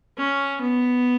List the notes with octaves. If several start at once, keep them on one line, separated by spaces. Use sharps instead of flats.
C#4
B3